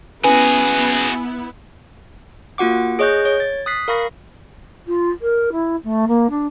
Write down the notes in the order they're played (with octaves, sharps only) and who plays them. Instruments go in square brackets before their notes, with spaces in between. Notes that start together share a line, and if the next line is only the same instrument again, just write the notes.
[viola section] B3 E4 [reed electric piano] C#4 B4 [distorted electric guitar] F#4 G#4 [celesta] G#5
[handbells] A#3 F4 F#4 F#5 D6
G#4 C#5 D#5 C#6 F#6 G6
C#5
A6
D#6 F#6 B6 C7
A#4 F5 B5 C#6 A#6
[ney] F4
A#4
E4
A3
A#3
D4